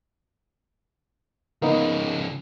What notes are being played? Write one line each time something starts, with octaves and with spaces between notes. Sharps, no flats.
C#3 F3 A#3 B3 D#4